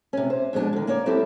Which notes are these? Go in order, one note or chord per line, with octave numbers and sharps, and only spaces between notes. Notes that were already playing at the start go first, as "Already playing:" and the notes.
C3 C#4
C5
F2 B2 G#3 C4 D4
D3 D#3
A#3 C#4 C#5 D5
F#3 C4 E4 G4 A4